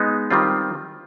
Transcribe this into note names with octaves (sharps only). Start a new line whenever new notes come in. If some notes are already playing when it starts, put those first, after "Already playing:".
Already playing: G#3 B3 D#4
D#3 G3 C4 F4